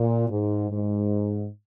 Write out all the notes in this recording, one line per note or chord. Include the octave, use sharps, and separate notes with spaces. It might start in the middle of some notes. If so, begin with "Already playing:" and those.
Already playing: A#2
G#2
G#2